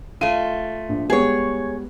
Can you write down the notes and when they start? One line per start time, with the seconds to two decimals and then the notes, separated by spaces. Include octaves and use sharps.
0.21 A3 F4 D#7
0.89 A#1
1.10 G3 G#3 B3 G#4 C#5